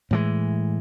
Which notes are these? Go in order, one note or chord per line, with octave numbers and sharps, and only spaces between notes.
A2 E3 G#3